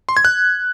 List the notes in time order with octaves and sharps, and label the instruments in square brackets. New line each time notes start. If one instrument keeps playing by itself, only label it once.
[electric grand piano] C6
G#6
F#6